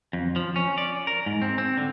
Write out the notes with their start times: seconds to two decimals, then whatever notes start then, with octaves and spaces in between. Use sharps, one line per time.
0.13 F2
0.36 F3
0.56 C#4
0.78 D5
1.07 A#4
1.26 G#2
1.42 C4
1.58 C4
1.78 D3